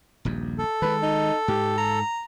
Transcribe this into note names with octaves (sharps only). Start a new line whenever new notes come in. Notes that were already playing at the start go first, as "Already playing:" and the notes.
D#1 A#1 G2
A4
D#3 G#3 B4
D#4
G#2 G4
A#5